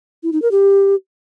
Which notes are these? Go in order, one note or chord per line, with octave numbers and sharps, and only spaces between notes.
E4
D#4
A#4
G4